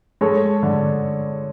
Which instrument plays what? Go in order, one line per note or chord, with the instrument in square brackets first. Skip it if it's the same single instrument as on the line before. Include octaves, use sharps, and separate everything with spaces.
[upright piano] G#3 A4 C#5
D3